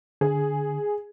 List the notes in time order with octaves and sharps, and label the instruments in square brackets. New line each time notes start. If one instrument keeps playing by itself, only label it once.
[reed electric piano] D3 [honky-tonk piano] G#4